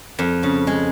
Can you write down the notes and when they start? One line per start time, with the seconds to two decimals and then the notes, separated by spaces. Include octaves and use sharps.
0.19 F2
0.43 C#3
0.67 G#3